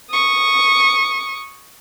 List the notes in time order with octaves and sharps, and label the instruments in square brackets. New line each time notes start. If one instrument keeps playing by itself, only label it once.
[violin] C#6 D#6